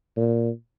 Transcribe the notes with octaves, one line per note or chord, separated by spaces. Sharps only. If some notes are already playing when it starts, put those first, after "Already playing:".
A#2